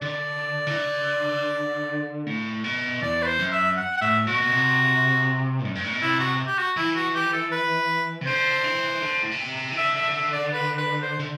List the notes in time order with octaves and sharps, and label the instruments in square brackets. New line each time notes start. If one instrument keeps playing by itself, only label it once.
[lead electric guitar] D3 [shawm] D5
[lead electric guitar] E3
D3
A2
B2
[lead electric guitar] E2 [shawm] D5
[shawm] B4
C5
[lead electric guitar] F#2
[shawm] E5
F#5
F#5
[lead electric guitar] A2 [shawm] E5
[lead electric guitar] B2 [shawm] F#4
[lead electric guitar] B2
C3
F#2
G2
A2
B2
[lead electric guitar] C3 [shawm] E4
[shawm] F#4
G4
F#4
[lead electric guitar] E3 [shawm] E4
[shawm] F#4
G4
A4
B4
[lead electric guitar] C3
[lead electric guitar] D3 [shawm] C5
[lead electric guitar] E3
D3
A2
B2
C3
E3
[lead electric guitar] D3 [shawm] E5
[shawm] E5
E5
D5
B4
B4
C5
[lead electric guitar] D3